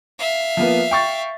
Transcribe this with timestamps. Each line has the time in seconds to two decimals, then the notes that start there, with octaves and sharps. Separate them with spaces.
0.19 E5 F5
0.57 F3 A#3 B3
0.91 G5 C#6 A6